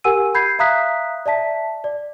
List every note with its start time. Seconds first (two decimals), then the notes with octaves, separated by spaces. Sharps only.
0.04 G4 A#4 F#5 G#5 E6 D#7
0.35 B5 G6 G#6 C7
0.59 E5 F5 A#5 D#6 F#6 B6
1.26 D5 E5 A5 B6
1.84 D5